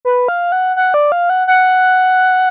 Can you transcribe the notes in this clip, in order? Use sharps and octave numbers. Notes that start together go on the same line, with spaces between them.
B4
F5
F#5
F#5
D5
F5
F#5
F#5